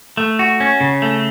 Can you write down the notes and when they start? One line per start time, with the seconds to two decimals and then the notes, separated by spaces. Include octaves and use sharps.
0.17 A3
0.39 F#4
0.60 C#4
0.81 C#3
1.02 A3